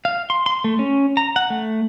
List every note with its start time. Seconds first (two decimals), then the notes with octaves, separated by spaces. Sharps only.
0.05 F5
0.30 C6
0.46 C6
0.64 A3
0.79 C#4
1.17 A#5
1.36 F#5
1.50 A3